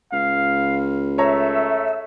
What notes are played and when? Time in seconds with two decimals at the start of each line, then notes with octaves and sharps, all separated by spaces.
0.12 C#2 F5
1.18 A3 C#5 E5 A#5